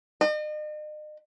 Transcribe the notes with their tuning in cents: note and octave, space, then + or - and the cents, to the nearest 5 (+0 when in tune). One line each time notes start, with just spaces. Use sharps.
D#5 -40